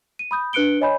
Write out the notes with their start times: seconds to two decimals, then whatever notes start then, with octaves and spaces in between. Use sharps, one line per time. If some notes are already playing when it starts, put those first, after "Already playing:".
0.19 D#7
0.31 B5 D#6 G6
0.53 D4 B4 F#6 C#7 D7 G7
0.81 C#5 D#5 G#5 B5 G6